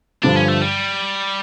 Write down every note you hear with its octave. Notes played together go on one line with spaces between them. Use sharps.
G2 D3 F3 D4
C#4
A3
G3